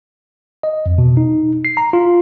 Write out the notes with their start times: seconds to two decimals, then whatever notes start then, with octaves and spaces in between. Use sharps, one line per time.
0.63 D#5
0.86 F2
0.98 B2
1.17 D#4
1.65 C7
1.77 A#5
1.93 F4